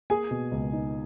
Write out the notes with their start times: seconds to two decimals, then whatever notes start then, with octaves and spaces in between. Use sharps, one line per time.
0.10 A#3 G#4 G#5
0.31 B2
0.51 C#2
0.73 D#4